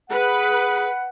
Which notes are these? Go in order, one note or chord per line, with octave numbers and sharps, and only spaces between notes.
G#4 B4 F#5